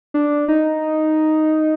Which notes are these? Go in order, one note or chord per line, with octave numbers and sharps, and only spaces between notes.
D4
D#4